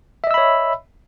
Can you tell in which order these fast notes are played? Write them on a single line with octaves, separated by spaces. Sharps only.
E5 D#5 E6 B5 C#5